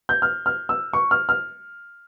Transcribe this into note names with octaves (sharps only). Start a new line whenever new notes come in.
G6
F6
F6
E6
C#6
F6
F6